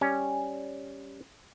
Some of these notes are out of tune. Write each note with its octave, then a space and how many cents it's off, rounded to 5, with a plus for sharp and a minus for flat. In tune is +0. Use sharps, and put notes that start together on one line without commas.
G3 +0 C#4 +0